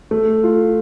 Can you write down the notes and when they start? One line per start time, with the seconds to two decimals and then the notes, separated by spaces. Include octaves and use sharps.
0.11 A3
0.43 F4